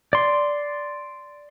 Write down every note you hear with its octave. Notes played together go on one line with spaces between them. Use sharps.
D5 C6